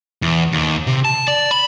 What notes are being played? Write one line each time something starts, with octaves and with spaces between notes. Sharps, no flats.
E2
D#2
C3
A5
D5
B5